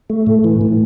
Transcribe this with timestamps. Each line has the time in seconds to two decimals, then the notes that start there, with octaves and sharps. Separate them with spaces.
0.10 A3
0.27 A2
0.44 E3
0.61 A2